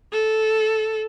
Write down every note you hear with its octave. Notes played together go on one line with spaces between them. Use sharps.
A4